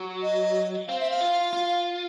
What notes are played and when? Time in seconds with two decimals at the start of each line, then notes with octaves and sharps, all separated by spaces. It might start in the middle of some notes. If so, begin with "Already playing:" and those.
Already playing: F#3
0.23 D#5
0.88 C4 F5
1.00 E5
1.11 F5
1.21 F4
1.53 F4